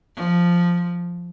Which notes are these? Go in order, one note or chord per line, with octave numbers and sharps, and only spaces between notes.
F3